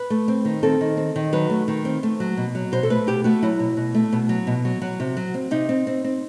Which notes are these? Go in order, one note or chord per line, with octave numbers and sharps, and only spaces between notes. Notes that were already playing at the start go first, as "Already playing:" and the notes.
Already playing: B4
A3
C4
D#3
C4 A4
D#3
C4
D#3
F#3 B4
A3
D#3
C4
A3
F#3
B2
F#3
B2 C5
A4
A3 B4
B2 G4
A3 F#4
F#3 E4
B2
B2
A3
B2
F#3
B2
F#3
F#3 F#4
C3
F#3
C4
C3 D#4
C4
C4
C4